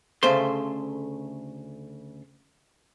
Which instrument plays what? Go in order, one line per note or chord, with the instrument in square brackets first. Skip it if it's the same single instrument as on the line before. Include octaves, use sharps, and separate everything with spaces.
[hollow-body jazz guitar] D2 C#3 A3 C5 C6